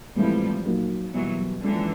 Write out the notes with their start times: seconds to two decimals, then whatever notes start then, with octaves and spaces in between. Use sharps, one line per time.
0.16 A2 E3 F3 G3 G#3 C4 E4
0.65 A#2 F#3 A#3 D#4
1.13 B2 E3 F#3 G3 A#3
1.63 D3 E3 F3 G#3 C#4